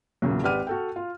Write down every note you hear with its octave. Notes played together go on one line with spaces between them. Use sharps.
E2 A#2 C#3 F#3
G#1 G4 B4 D5 F6 D#7
F#4 A4 G5
F4